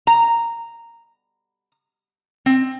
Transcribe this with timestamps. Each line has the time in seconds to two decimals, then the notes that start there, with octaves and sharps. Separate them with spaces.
0.07 A#5
2.46 C4